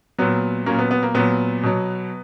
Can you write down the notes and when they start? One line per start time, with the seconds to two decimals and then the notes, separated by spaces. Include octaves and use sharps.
0.18 A#2 F#3 B3
0.66 A#2 F#3 A#3 C#4
0.79 B3
0.91 B3
1.03 A#3
1.14 A#2 F#3 B3
1.63 B2 F#3